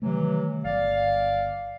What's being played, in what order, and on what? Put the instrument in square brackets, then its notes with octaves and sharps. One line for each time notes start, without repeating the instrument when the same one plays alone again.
[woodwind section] C3 E3 F#3 [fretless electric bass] D#3 G3 A3
[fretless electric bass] G1 [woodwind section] D5 F5